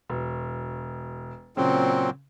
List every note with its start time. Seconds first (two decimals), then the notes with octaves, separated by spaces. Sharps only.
0.10 E1
1.57 A#2 C#3 F#3 C4